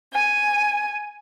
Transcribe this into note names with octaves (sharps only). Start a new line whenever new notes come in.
G#5